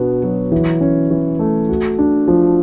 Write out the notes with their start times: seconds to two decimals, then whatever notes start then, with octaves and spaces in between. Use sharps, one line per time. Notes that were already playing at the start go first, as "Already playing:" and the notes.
Already playing: B2 B3 D4
0.23 F#3
0.52 E3
0.81 C#4
1.10 E3
1.39 A3
1.69 F#4
1.98 D4
2.28 F3